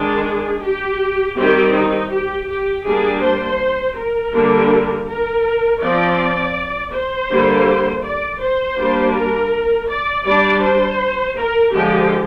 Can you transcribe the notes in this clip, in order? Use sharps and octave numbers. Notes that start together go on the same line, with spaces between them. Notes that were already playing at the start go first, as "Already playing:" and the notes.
Already playing: D#3 G#3 D4 G#4
G4
D#3 G3 C4 G4
D#4
G4
G4
G3 A#3 D4 G#4
C5
A#4
D3 G3 A#3 D4
A#4
F3 C4 D5
C5
D3 G3 A#3
D5
C5
G3 A#3 D4
A#4
D5
G3 D4 D5
C5
A#4
D3 F3 G#3 G4